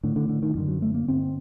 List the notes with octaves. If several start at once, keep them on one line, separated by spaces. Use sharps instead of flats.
A2 D3
D3
D3
D#3
F#2 D3 D#3
F#3
A3
A#3
G2 D3 C4